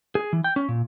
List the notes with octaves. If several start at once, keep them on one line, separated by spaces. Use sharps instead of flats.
G#4
E3
G5
C#4
A#2